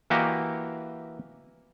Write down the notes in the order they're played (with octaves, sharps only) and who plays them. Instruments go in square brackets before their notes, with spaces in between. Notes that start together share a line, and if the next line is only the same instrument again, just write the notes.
[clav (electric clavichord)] E3 A#3 F#4 G4 D#5